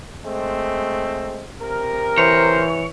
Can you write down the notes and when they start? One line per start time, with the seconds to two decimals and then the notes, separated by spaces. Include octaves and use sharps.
0.24 G#3 A3 C4
1.61 C3 A#4
2.18 E3 C5 C#5